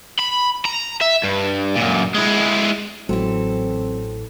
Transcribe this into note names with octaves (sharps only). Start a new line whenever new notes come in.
B5
A#5
E5
G2
F#2 A#2
G#3 E4
A1 E3 F#3 C4 A4